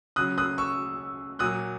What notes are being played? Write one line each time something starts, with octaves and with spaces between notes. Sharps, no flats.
C#3 F#3 D#6 F#6
D#6 F#6
C#6 E6
A#2 F#3 D#6 F#6